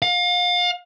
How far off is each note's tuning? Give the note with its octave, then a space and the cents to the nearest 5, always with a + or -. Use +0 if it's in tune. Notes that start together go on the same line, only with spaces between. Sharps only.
F5 +35